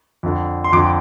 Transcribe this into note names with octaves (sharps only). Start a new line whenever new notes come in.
F2 D3
C6
F2 D3 D6